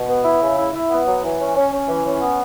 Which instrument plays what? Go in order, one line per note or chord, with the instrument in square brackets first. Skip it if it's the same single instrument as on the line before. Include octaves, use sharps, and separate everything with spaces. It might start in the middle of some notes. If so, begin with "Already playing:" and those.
Already playing: [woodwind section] B2
B3
E4
C#3
E4
E4
B3
F#3
E3
C#4
C#4
C#4
E3
C#4
B3